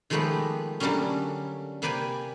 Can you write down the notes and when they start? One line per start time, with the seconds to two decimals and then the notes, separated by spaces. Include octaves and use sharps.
0.10 D#3 F3 G#3 A3 B3 G4
0.80 D3 F#3 G3 A3 A#3 C#4
1.82 C3 A#3 B4 D5 G5 G#5